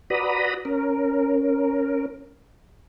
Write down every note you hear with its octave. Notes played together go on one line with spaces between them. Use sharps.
F#4 B4 D5 A#5 B5 D#6
C#4 A#4